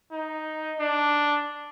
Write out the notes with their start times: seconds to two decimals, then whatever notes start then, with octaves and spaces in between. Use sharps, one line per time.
0.12 D#4
0.80 D4